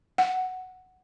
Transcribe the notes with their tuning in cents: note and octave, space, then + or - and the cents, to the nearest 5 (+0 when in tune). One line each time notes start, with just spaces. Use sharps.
F#5 +5